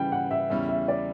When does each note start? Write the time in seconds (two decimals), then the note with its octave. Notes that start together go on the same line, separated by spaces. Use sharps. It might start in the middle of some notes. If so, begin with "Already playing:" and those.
Already playing: C#3 E3 G3 G5
0.12 F#5
0.31 E5
0.50 E2 C#3 G3 C#4 E4 E5
0.69 E5
0.88 D5